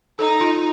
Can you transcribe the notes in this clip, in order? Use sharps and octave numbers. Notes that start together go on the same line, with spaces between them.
D#4 A4
F4